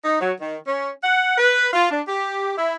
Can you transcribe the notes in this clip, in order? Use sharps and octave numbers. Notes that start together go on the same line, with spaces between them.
D#4
F#3
D#3
C#4
F#5
B4
F4
D4
G4
E4